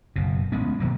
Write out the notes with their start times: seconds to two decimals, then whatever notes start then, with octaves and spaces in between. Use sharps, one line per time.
0.16 F#1 B2
0.52 A1 G#3 B3 C#4
0.80 B2 D#3 F#3 A#3